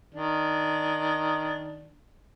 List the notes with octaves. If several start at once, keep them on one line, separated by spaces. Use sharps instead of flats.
D#3 D4